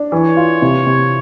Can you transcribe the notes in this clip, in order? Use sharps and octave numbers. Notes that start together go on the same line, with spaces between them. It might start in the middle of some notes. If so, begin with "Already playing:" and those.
Already playing: D4
E3 C#5
F4
C3
C3